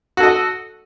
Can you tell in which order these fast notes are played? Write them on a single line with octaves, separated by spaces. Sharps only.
F#4 A4 D#5